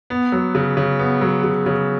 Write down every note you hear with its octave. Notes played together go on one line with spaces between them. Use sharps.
B3
F#3
C#3
C#3
B3
F#3
C#3
C#3